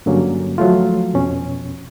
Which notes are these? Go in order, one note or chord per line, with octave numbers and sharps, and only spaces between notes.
G2 D3 F#3 A#3 C#4
F3 F#3 A3 F4
F2 B2 C#4